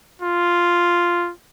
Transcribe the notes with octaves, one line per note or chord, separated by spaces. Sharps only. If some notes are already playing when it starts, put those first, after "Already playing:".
F4